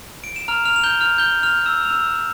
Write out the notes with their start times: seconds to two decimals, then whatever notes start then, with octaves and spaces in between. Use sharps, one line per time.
0.24 D7
0.36 E7
0.48 A#5 F6 F7
0.65 F6 F7
0.76 F7
0.84 A#5 G6 G7
1.01 F6 F7
1.18 G6 G7
1.43 F6 F7
1.55 G6
1.66 E6 E7
1.85 F7
1.90 E6 E7